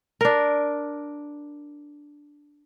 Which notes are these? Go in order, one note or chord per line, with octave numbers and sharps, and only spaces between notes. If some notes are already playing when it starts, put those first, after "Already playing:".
D4 A#4